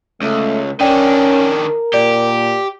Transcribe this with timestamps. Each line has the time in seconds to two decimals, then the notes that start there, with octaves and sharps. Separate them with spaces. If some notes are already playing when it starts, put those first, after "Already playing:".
0.22 C#2 A3
0.80 D#3 C#4 D4 A#4 D5 G5
1.94 A#2 G4 D5